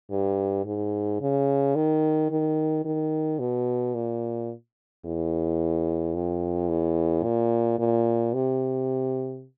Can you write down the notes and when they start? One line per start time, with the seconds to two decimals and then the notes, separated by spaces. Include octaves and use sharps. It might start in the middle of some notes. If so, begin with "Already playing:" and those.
0.10 G2
0.65 G#2
1.20 C#3
1.75 D#3
2.30 D#3
2.85 D#3
3.39 B2
3.94 A#2
5.05 E2
6.14 F2
6.69 E2
7.23 A#2
7.78 A#2
8.33 C3